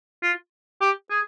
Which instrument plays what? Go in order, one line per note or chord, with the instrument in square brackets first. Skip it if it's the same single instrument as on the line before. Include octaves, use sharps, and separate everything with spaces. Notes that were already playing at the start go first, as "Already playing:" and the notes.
[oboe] F4
G4
G#4